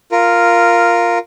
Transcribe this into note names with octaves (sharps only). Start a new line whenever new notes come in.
F4 A#4